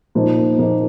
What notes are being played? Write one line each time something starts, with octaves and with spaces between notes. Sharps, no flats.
A#2 F3 A#3 D#4
A#2 F3 A#3 D#4